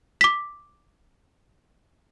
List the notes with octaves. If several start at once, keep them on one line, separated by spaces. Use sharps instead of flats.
D6 B6